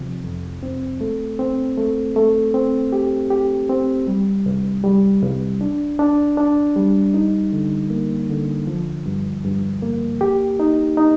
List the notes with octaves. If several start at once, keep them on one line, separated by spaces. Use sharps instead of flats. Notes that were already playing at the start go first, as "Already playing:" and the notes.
Already playing: C3 F3
F2
C4
A3
C4
A3
A3
C4
G4
G4
C4
G3
C2
G3
C2
D4
D4
D4
G3
D#4
D3
A#3
D3
F3
G2
G2
A#3
G4
D#4
D#4